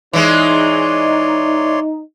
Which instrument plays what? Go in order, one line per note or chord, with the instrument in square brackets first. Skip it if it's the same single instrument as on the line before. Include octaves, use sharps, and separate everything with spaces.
[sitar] E3 G#3 [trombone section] D#4 [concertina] C#5 D5 C6